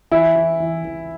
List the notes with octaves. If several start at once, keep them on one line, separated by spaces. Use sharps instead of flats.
E3 E4
E3
E3
E3